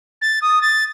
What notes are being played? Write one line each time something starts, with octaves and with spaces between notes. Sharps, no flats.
A6
D#6
A6